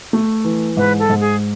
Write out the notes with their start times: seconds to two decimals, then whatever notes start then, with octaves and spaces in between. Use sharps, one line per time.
0.13 A3
0.45 E3
0.77 G#2 B4
0.99 A4
1.09 G#2
1.21 G#4